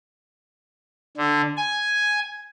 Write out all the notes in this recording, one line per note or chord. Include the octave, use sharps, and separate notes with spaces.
D3
G#5